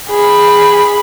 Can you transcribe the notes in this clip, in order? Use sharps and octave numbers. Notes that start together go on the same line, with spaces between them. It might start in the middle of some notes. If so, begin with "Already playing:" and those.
G#4 B5